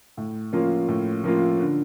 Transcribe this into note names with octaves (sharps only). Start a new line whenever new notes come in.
A2
F3 A#3 C#4 F4
A2
F3 A#3 C#4 F4
D3